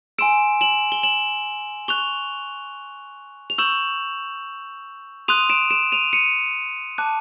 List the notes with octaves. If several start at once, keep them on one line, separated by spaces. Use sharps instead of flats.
G#5 C6 E6 D7 E7
E7 F#7
G7
E7 F#7
C#6 F#6 F7 G7
F7
C#6 E6 G6 E7 F#7
C6 D#6 F#6 D#7 F7
D7 E7
D7 E7
D#7 F7
C#7 D#7
A5 D6 F#6